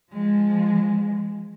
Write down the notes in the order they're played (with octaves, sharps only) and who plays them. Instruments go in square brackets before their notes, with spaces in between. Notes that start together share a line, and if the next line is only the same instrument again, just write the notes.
[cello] F3 G#3